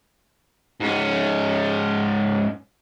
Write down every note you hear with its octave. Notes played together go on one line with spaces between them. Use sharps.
G#2 C#4